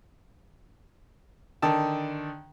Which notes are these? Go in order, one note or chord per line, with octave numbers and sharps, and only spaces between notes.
D3 D#3 A5